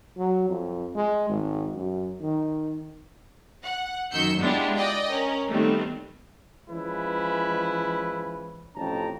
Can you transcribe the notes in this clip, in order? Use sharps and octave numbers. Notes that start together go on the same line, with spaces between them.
F#3
F2
G#3
G#1
F#2
D#3
F#5
F#2 D#3 E6 G6 C#7
G#3 B3 D4 E4 F4 G4
D5 D#5 G5
C#4 A#4
D#3 G3 A3 B3 C4
E3 F3 G#3 C#4 E4 B4
A1 F2 C#4 G5 A5 A#5